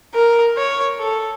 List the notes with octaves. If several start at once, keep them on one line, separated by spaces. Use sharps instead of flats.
A#4
C#5
A4